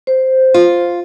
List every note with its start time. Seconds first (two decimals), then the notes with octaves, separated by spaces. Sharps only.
0.07 C5
0.54 F4